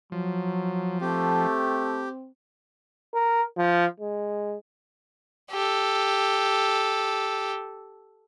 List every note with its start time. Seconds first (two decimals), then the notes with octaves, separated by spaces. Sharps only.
0.12 F3 F#3
1.01 A3 C4 G4
3.14 A#4
3.57 F3
4.00 G#3
5.52 G4 A4